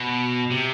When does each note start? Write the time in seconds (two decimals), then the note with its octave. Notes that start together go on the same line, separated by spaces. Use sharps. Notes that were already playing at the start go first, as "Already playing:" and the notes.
Already playing: B2
0.51 C3